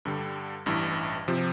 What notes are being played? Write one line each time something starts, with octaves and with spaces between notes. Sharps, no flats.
G2 D3 G3
A1 G2 E3
C3 F3